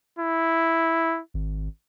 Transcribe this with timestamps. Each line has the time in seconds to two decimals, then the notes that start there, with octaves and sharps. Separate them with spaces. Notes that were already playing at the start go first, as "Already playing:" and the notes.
0.19 E4
1.34 G#1